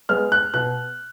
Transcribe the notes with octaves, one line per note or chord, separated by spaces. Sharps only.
G#3 B3 F6
F#6
B2 F#6